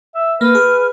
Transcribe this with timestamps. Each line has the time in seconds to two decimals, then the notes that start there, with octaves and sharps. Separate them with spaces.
0.15 E5
0.41 A#3 B4 F6
0.55 G#4